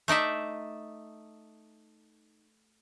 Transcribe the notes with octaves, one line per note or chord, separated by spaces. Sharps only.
A3 D#4 D5 E5